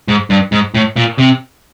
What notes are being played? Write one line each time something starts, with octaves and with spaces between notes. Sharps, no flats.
G#2
G2
G#2
A2
A#2
C3